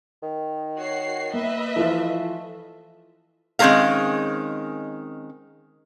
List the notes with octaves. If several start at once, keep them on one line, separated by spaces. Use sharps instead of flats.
D#3
F#4 C#5 C7
A#3 B4 D#5 E5
E3 F3 A3 F4
D#3 G#3 C4 C#4 A#4 F5